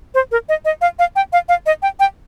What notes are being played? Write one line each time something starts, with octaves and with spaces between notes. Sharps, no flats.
C5
A#4
D#5
D#5
F5
F5
G5
F5
F5
D#5
G5
G5